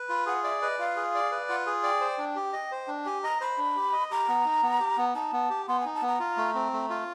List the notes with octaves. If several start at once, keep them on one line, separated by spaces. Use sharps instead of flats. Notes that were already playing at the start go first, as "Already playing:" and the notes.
Already playing: B4
F4 B5
G#4 F#5
D5 E5
B4 D#5
F4 F5
G#4
D5
B4
F4 F#5
G#4
D5 G5
C5
D4
G4
D#5
C5
D4
G4 G#5
D#5 A#5
C5 B5
D4
G4
D#5
G4 A#5
B3
D#4
B3
G4
B3
D#4 A5
B3
G4
B3 C6
D#4 G#5
A5
B3
A#5
F4
A3
C4
A3
F4